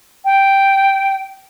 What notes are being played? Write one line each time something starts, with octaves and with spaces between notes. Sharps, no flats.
G5